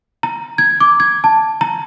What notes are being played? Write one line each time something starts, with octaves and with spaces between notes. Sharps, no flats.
A#5
G#6
D6
G#6
A5
A#5